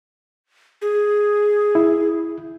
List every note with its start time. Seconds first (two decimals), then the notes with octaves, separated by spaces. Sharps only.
0.82 G#4
1.75 E4